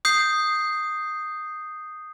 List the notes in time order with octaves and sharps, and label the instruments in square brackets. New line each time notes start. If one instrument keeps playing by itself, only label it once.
[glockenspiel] D#6 G6 C7